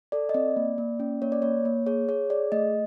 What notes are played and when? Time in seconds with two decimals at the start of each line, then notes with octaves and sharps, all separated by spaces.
0.12 A4 D5
0.29 D#5
0.34 C4 D5
0.56 A#3
0.78 A#3
1.00 C#4
1.22 A#3 C#5
1.32 D5
1.42 A#3 C#5
1.65 A#3
1.86 G#4 C#5
2.09 G#4 C#5
2.30 G#4 D5
2.52 A3 D#5